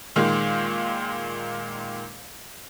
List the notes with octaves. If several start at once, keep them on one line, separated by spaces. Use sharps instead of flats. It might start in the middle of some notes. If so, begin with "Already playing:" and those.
A#2 D#3 G#3 A#3